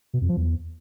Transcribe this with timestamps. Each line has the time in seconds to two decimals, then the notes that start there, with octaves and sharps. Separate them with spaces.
0.13 B2
0.21 F2
0.29 F3
0.37 E2